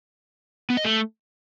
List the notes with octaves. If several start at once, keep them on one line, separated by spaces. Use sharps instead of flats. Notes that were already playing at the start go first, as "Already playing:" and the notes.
B3
D#5
A3